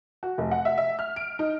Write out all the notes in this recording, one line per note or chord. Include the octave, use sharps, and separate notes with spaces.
F#4
F1
F#5
E5
E5
F6
D7
D#4